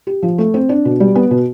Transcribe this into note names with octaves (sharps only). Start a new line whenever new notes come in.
G4
F3
A3
C4
D4
B2
G3
B3
B2